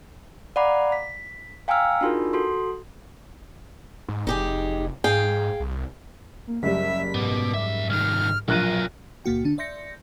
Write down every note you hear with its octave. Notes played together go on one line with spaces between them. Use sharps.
D5 F5 F#5 A#5 B5 D6
B6
F5 G5 G#5 A#5 E6 F6
D4 D#4 F4 F#4 G#4 A#4
F#4 A4 C6
G#2
F1 D#4 G4 G#4
G#2 G#4 F5 G5
C2
A#3
F#1 G3 E5 B6
G#2 B2 B3 D6
F2 E5
C2 D#3 F6
A#1 B2 F#3 F4 A#4 F#6 D#7
C#2 A#2 A#3 F#4 G5
D3 D4
D5 E5 C6 G6 A#6 C#7